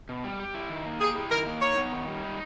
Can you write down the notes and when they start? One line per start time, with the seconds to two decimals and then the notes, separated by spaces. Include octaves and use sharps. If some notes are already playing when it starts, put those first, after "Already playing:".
0.09 B2
0.24 G3
0.40 G4
0.55 E4
0.70 D#3
0.86 A#3
1.01 G4 G#4
1.16 E4
1.31 D#3 A#4
1.46 A#3
1.62 D#4 C#5
1.77 B3
1.92 D#3
2.08 G3
2.23 D#4